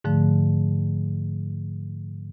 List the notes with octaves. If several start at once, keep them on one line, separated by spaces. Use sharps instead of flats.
G#2 D3 F3 A3